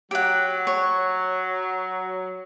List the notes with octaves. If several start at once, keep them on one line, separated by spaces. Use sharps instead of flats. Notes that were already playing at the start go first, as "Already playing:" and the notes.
F#3 G4 F#5
C#5